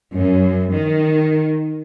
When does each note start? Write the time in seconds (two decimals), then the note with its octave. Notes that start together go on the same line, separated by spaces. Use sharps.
0.15 F#2
0.74 D#3